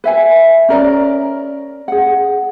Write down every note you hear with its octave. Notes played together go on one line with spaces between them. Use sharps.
B4 E5 G#5
C#4 A#4 D5
G#4 F#5